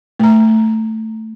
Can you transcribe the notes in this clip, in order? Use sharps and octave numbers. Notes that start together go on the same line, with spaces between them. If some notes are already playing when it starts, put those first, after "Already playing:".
A3 A#5